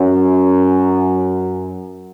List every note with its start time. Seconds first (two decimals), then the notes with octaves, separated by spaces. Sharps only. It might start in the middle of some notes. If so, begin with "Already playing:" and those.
Already playing: F#2